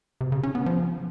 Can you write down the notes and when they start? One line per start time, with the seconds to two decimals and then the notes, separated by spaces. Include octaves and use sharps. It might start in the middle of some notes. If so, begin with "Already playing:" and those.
0.21 C3
0.32 C#3
0.43 C#4
0.55 B3
0.66 F3